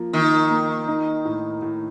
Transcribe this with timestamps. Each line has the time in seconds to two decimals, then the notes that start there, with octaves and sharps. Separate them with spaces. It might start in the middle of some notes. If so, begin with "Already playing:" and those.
Already playing: F3 A#3
0.13 D#3 A#3
0.51 A#3
0.88 D#4
1.25 A2
1.62 A2